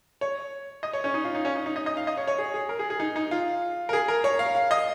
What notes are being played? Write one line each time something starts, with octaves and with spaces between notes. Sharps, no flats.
C#5
D#5
C#5
C#4
D#4
F4
D#4
C#4
D#4
D#4
D#5
D#5
F5
D#5
C#5
C#5
G#4
G#4
A#4
G#4
G#4
D#4
D#4
F4
A#4
G#4
A#4
C#5
F5
F5
D#5